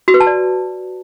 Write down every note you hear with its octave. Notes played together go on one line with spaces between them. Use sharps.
F#4
B4
A5
D5